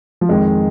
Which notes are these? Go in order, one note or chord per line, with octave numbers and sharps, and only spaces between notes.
F3
F2 D#3 G#3